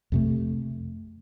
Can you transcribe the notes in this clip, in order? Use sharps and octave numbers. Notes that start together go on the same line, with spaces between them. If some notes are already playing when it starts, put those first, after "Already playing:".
F2 C3 A3